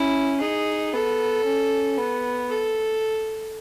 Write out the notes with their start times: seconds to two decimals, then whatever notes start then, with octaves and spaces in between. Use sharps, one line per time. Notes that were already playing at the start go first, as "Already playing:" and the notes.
Already playing: C#4 E4
0.41 D#4 G#4
0.94 B3 A4
1.45 C#4
1.98 B3
2.50 A4